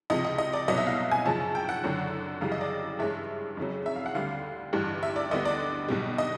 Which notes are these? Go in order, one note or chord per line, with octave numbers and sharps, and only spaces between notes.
C#2 C3 F3 D#5
D#5
D#5
D5
C2 B2 F#3 B3 D#5
E5
F5
G#5
F#2 C#3 F3 A5
G5
F#5
F#1 F#2 D3 F#3
F#2 C#3 E3 G3 F5
D#5
D5
G2 E3 G#3 C#4 E5
F2 C#3 F#3
E5
F5
F#5
D2 D3 G3 F5
A1 G2 E3 G3
E5
D5
D2 D3 G3 B3 D#5
D5
B1 B2 G3
D#5